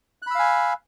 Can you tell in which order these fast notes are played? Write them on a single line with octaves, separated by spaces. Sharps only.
F#6 B5 E6 F5 G#5